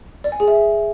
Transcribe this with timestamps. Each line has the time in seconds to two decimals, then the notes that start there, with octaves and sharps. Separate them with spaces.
0.24 D5
0.32 G#5
0.40 G#4
0.48 E5